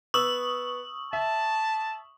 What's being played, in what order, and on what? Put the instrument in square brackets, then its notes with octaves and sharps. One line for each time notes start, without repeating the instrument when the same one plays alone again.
[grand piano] B3 E6 [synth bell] C#6 D#6 F#7
[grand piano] E5 [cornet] A5